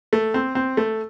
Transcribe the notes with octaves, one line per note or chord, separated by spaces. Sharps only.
A3
C4
C4
A3